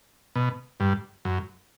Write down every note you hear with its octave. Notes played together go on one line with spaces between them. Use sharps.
B2
G2
F#2